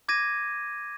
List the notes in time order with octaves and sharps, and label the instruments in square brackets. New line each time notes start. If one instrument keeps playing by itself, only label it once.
[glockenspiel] D6 G#6 A#6 D#7